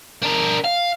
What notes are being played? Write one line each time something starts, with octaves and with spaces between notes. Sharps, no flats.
D4 A#4
F5